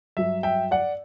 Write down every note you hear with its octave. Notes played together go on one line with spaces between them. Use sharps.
G2 F#3 E5
E5 G5
D5 F#5